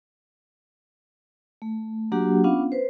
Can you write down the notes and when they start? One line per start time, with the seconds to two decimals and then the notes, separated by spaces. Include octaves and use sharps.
1.62 A3
2.12 F#3 A#3 D4 F#4 G4 F#5
2.44 B3 C#4 D4 F4 F5 F#5
2.72 B4 C5